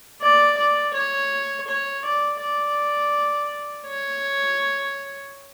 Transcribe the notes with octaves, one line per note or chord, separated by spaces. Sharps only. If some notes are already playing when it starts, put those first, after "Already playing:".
D5
D5
C#5
C#5
D5
D5
C#5